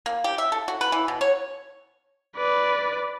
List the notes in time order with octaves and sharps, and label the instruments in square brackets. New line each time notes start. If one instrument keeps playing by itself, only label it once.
[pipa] A#3
G4
E5
A4
F#4
B4
E3
B2
C#5
[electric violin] B4 D5